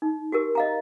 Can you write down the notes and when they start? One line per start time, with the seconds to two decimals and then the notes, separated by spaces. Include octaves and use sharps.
0.02 D#4
0.32 F#4 G4 A#4
0.55 D#5 F5 A#5